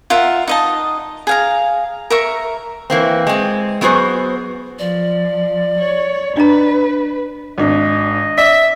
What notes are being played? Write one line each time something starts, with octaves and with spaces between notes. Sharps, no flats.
F4 A#4 E5 F#5
D#4 D#5 A5
G#4 F5 A#5
A#4 E5 C#6
E3 A#3 C4
G#3 C4
F#3 B3 F#4 G#4 C5
F3 D5
C#5
D4 B4 D#5 A#5
G#1 D4 D#5
D5 E5 B6